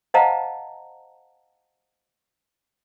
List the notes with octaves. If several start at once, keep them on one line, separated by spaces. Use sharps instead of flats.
C5 D#5 F5 F#5 A5 A#5